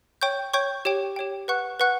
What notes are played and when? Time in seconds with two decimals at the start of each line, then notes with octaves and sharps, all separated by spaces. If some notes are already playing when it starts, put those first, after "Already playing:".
0.22 C#5 G5 C#6 G6
0.54 C#5 G5 C#6 G6
0.85 G4 C#5 G5
1.16 G4 C#5 G5
1.48 B4 F#5 C#6 F#6
1.80 B4 F#5 C#6 F#6